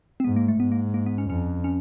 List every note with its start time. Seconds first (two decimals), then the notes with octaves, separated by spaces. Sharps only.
0.20 C4
0.24 G#2 B3
0.36 A#3
0.48 A3
0.59 G#2 B3
0.72 A#3
0.94 A#3
1.06 B3
1.18 C#4
1.30 F2 C#4
1.64 C#4